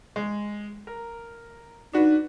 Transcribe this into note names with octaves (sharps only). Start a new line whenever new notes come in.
G#3
A#4
D4 D#4 F#4 B4